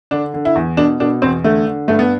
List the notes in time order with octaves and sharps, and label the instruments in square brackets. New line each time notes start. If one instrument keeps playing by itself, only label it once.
[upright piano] D3 D4
D3
E4
E2
B2 D4
B2 D4
E2 C4
D3 A3
D3
G2 A3
B3